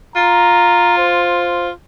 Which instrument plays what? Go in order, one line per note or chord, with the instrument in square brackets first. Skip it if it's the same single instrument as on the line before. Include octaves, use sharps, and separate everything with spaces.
[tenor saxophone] F4 [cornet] A#5
[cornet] C5